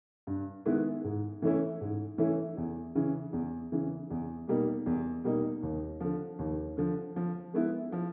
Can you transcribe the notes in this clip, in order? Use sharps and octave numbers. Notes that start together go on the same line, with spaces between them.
G2
D#3 G#3 B3 E4
G#2
E3 A3 C#4 E4
G#2
E3 A3 C#4 E4
E2
C#3 E3
E2
C#3 E3
E2
B2 G3 A#3 D#4
E2
B2 G3 A#3 D#4
D#2
D3 F3
D#2
D3 F3
F3
G#3 B3 E4
F3